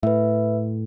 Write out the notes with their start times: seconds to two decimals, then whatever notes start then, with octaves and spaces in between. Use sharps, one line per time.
0.03 A2 B4 E5